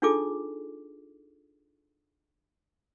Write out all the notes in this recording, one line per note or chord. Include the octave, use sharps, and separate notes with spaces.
D4 D#4 F4 G#4 A4 D6